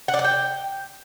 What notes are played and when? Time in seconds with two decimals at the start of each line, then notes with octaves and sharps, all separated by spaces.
0.08 F#5
0.14 D5
0.19 F#5
0.24 G5